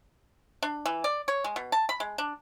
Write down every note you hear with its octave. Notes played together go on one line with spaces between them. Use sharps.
D4
E3
D5
C#5
G#3
B2
A5
B5
G#3
D4